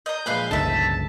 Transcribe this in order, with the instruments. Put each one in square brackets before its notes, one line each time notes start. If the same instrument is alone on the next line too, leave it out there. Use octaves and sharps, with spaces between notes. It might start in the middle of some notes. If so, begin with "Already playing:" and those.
[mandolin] D#5 A#5 [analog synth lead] G6
[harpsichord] A#1 G#3 [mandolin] B4 D#5 F5
[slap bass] G1 C#2 D3 [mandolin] D#4 E5 [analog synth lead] A5